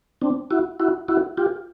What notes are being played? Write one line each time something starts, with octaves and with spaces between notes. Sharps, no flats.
C4 D4
E4 F#4
E4 F#4
E4 F#4
F4 G4